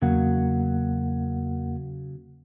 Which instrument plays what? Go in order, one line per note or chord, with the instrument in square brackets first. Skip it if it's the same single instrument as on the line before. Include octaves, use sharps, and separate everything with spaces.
[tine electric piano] E2 A#3 F#5 [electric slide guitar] C#3 F#3